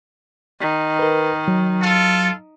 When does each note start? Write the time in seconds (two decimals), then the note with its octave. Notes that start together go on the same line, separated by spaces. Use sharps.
0.61 D#3
0.99 A#4 B4
1.48 F#3
1.82 F4 A4